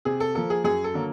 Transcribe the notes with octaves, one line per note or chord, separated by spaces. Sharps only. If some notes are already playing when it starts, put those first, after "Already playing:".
C3 G#4
A4
F3 A#3 A4
G#4
F#2 G#4
A4
D3 F#3 A#3